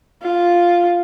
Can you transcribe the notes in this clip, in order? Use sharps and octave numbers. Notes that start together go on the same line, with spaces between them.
F4